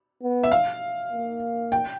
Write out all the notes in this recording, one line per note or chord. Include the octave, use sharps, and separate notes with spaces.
B3
E5
F5
A#3
G5